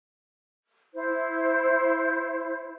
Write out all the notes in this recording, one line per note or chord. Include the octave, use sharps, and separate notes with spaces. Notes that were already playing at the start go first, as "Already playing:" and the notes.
E4 C5